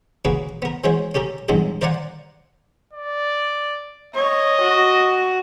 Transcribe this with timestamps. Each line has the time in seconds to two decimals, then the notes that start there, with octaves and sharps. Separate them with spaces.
0.25 C#3 A#3 F#4 G#4 B4
0.62 B3 A#4
0.84 E3 G#3 C#4 F#4 C5 C#5
1.15 C#4 G4 A4 A#4
1.49 B1 G2 E3 F#3 G#3 A4
1.82 A#4 C5 D5 F5 F#5 G#5
2.94 D5
4.15 C#5 D#5
4.61 F#4